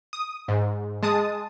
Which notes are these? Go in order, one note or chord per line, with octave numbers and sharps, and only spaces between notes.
D#6
G#2
G#3 A5 D#6